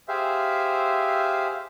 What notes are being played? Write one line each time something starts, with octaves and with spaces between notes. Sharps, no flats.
G4 G#4 C5 E5 F5